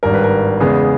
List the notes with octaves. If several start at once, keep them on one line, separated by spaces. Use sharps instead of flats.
G#1 G2 G3 A#4
B4
A#4
E2 C#3 G#3 B3 G#4